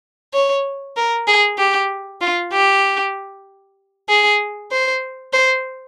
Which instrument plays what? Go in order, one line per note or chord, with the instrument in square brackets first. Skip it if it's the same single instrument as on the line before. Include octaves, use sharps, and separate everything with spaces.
[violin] C#5
A#4
G#4
G4
F4
G4
G#4
C5
C5